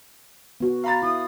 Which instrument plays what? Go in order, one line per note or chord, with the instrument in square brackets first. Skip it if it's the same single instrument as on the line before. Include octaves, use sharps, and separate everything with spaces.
[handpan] B3 F#4
[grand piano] F5 B5 A6 [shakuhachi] A#5
[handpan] E4 [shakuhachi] D#6